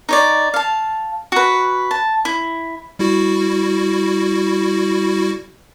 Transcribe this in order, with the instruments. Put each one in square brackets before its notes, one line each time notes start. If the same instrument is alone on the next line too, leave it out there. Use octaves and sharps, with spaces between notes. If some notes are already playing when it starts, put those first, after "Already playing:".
[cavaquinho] D#4 C#5 D5
F5 A5
F#4 B4
A5
E4
[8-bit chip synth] G3 E4 F#4